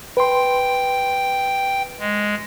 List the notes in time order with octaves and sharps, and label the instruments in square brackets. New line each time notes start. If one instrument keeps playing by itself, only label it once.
[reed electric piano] B4 C6 [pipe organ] G5
[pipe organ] G#3